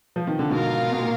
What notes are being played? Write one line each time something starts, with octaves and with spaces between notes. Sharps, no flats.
F3
D#3
D3
G#2 B2 F4 A#4 F5
B2
A#2